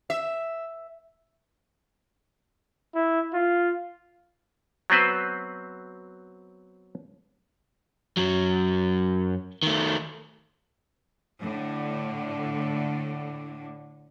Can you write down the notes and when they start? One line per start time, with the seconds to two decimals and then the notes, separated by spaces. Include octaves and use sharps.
0.10 E5
2.95 E4
3.34 F4
4.90 F#3 B3 C4 B4 C5
8.17 F#2 F#3
9.63 D#3 A3
11.40 A2 D3